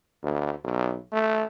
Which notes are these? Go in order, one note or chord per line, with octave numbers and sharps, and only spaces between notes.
D2
B1
A3